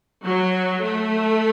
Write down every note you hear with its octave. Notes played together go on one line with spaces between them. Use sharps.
F#3
A3